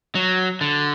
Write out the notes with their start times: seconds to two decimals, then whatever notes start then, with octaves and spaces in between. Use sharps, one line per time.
0.15 F#3
0.61 D3